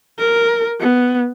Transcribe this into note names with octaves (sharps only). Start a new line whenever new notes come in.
A#4
B3